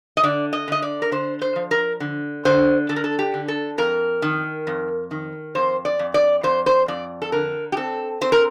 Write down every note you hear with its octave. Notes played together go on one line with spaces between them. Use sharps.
D#5
D3 D5
D#5
D3 D#5
D5
A#4
D3 C5
C5
F3
A#4
D3
D3 C5
D3 A4
A#4
A4
G4
D3
A4
F2 A#4
D#3
F2
D#3
F2 C5
D5
F2
D5
F2 C5
C5
F2 D5
A4
D3 A#4
G4
C4 A4
C4 C5
A#4